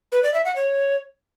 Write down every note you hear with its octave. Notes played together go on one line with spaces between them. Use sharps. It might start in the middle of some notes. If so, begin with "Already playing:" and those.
B4
D5
E5
F#5
C#5